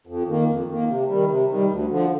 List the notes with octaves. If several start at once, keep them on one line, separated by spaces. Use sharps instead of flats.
F2
D#3 A#3
F2
D#3 A#3
C3
D#3 G3
C3
D#3 G3
D2
D3 F3